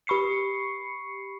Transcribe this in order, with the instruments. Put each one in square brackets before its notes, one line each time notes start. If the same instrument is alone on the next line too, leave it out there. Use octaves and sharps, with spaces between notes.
[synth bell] G4 B5 C#6 C7 C#7